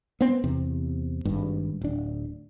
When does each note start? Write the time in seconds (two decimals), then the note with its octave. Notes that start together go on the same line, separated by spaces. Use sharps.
0.21 B3 C4
0.44 E2 C3
1.25 G#1 G2
1.81 D1 D4